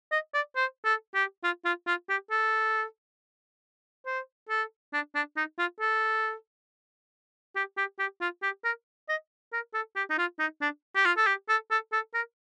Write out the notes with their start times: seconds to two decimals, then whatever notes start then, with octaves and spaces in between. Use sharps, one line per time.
0.12 D#5
0.34 D5
0.56 C5
0.85 A4
1.15 G4
1.44 F4
1.65 F4
1.87 F4
2.09 G4
2.31 A4
4.06 C5
4.49 A4
4.93 D4
5.15 D4
5.37 D#4
5.59 F4
5.80 A4
7.56 G4
7.77 G4
7.99 G4
8.21 F4
8.43 G4
8.64 A#4
9.09 D#5
9.53 A#4
9.74 A4
9.96 G4
10.10 D#4
10.18 F4
10.39 D#4
10.61 D4
10.96 G4
11.05 F4
11.17 A4
11.27 G4
11.49 A4
11.71 A4
11.92 A4
12.14 A#4